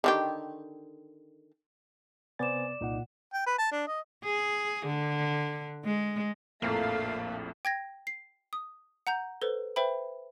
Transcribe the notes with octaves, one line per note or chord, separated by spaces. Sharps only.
D3 D#3 G4
C3 B3 C5 D5 G#5 D6 A6 E7
C2 A#2 D#4 F#5
G5
B4
A5
D4
D#5
G#4
D3
G#3
A#1 F2 A2 A3 A#3 F5
G5 G#6 A#6
C7
D#6
F#5 A#5 G6
A4 B4 C5
B4 C5 E5 G5 B5